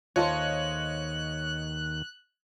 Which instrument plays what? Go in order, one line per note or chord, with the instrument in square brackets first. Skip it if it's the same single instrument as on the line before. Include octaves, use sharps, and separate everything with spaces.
[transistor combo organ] D#2 [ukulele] F4 A4 C5 [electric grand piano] C#5 D#5 [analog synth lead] F#6